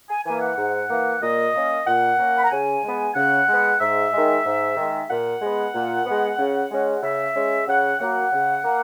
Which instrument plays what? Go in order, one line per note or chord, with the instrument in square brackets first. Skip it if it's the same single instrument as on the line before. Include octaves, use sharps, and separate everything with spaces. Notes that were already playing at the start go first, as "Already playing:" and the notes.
[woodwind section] G#5
E3 A#3 G#5
F#5
G#2
E3 A#3
A#2 D#5
A#3 C#4
A#2 F#5
A#3 C#4
B5
A#5
C#3 G#5
G#3
B3
C#3 F#5
G#3
B3
G#2 E5
D#3 G#3
G#2
D#3 G#3
A#2 F#5
G#3 B3
A#2
G#3 B3
C#3
G#3 C#4
C#3 E5
G#3 C#4
C#3 F#5
F#3 A#3 F#5
C#3
A#3